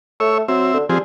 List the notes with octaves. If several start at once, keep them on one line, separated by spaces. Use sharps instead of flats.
A3 C#5 E5
F#3 C4 E5
D3
F3 G3 C4 G#4